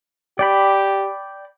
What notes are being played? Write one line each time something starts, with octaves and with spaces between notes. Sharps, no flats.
G4 D5 G5 B5